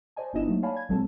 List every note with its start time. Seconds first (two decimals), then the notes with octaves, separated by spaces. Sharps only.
0.16 C5 D5 D#5 G#5 A5
0.33 G1 B3 D4 E4 D#5 E7
0.46 F#3 A3 A#3 D#4
0.63 C#5 D5 F5 G#5 A5 B5
0.76 G#6
0.89 A#1 F#3 G#3 C4 A4 A5